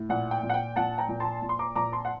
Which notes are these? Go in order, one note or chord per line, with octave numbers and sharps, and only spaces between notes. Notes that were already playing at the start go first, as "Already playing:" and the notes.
Already playing: A2
A#2 F#5
G5
A#2
F#5
G5
A#2 F#5 A5
G5 A#5
A#2
A5 C6
A#2
C6
A#5 D6
A#2 A#5 D6
A5 C6
F#5